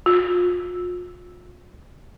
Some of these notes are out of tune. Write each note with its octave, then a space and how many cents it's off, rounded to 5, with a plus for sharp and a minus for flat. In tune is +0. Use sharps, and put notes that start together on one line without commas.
F4 +40